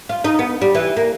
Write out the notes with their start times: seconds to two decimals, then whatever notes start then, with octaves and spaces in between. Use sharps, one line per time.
0.09 F4
0.24 D#4
0.39 B3
0.62 G3
0.75 E3
0.97 A#3